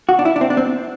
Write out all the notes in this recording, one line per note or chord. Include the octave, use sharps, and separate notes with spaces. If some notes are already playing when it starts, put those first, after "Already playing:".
F#4
D4
E4
D4
C4
D4
C4